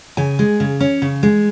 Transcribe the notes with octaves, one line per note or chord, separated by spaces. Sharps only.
C#3 G#5
G#3
C#3
C#4
C#3
G#3